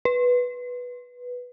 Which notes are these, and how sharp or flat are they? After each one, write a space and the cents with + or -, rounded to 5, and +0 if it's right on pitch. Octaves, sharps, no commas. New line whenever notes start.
B4 -5